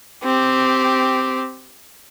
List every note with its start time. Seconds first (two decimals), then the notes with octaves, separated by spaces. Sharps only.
0.24 C4 G4